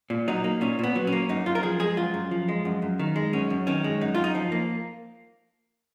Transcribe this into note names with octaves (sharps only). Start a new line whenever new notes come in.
A#2
F#3 D#4
A#3
A#2 C#4
A#2 B3
F#3
C#4
A#3
F#2 D#4
F#2 F4
A#4
F3 G#4
G#3 G#4
F#2 F4
F#2
F3
G#3
F#2
F#2
D#3
G#3
F#2 C#4
F#2
D#3 C#4
G#3
F#2 D#4
F4
F#2
D#4
F3
A#3